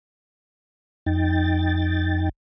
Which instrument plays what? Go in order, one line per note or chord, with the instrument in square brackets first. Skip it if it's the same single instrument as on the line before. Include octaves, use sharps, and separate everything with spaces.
[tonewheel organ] F2 D#4 G5 A6